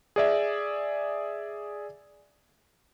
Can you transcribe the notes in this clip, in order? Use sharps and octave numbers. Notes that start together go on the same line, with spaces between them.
G#4 D5 E5